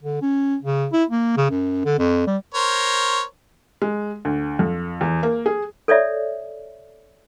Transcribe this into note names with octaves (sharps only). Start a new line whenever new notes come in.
D3
C#4
C#3
E4
A#3
C#3
F#2
D3
F2
G3
A#4 C5 C#5
G#3
D2
F2
E2
A#3
G#4
A4 C#5 D5 E5